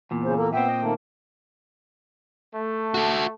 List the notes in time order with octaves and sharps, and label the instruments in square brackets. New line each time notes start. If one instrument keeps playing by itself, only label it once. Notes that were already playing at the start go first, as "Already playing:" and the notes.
[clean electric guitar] E2 A#2
[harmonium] C#3 [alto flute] C5
[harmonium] A#3 [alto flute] A4
[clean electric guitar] A#2 C4 [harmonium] B3 E5 [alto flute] G5
[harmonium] D#5
D#3 A3 A#3
[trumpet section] A3
[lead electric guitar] F#4 A4